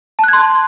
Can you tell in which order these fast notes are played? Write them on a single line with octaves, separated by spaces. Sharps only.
A5 F#6 G#6 C6